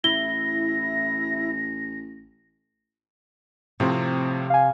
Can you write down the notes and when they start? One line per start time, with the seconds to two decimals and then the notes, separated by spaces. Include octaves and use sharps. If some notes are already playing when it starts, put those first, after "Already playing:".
0.04 A1 E4 A#6 G7
3.80 A2 C3 F3 C4
4.50 F5 G#5